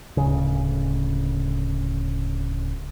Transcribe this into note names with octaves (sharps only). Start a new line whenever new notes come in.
D1 C#3